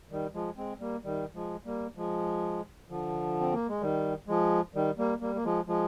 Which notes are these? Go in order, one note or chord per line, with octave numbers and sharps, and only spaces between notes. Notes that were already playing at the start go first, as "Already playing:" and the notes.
D#3 G3
F3 G#3
G#3 C4
G3 A#3
D#3 G3
F3 G#3
G3 A#3
F3 G#3
D3 F3
C4
A#3
G#3
D#3 G3
F3 G#3
D#3 G3
G3 A#3
G3 A#3
A#3
F3 G#3
F3 G#3